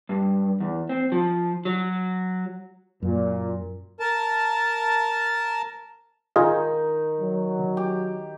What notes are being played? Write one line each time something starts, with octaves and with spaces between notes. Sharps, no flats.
G2
E2
C4
F3
F#3
F#2 A#2
A#4 A5
D#3 D#4 F4 G#4 D#5
F#3
G4